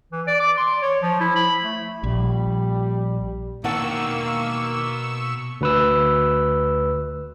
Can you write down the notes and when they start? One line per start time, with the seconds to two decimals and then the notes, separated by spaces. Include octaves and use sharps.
0.12 E3
0.27 D5
0.40 D6
0.57 C6
0.82 C#5
1.02 F3
1.21 E4
1.36 B5
1.63 A3
2.04 A#1 G3
3.64 B2 D#3 A#3 F#5 G5 A5 C#6 E6
5.61 D2 B4 E6